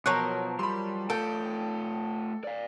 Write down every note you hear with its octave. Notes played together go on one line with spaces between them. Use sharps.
B2 F3 F#3 A#4 C#5 A5 C#6 F#6
G3 B5 C6
A3 F4 A4 G5
D5 F5